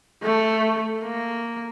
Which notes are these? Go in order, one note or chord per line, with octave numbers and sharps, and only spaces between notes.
A3
A#3